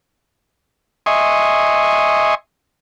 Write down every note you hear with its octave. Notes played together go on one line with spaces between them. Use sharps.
D#5 E5 G#5 C6 C#6 D#6